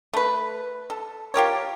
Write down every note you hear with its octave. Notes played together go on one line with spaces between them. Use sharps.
A3 B4
A4
F4 G4 A#4 C#5